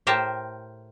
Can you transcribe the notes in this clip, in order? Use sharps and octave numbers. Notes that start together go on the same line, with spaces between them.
A2 G4 A#4 C5 A5